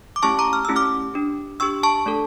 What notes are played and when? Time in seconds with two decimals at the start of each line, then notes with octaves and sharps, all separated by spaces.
0.16 D6
0.23 A3 C#4 E4 G4 A5 C#6
0.39 A#5 D6
0.53 F6
0.65 A3 C#4 E4 G4 E6
0.76 D6 F6
1.14 D4 G4
1.60 D4 G4 C#6 E6
1.83 A5 C#6
2.06 A3 D4 A4